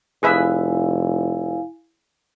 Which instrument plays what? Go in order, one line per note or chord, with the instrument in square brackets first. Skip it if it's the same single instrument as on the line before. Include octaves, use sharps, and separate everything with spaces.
[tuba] F1 [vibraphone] E4 F5 G#5 [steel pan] G#4 B4 E5